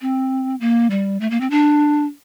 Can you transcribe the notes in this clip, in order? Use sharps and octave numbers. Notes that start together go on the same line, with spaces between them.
C4
A#3
G3
A3
A#3
C4
D4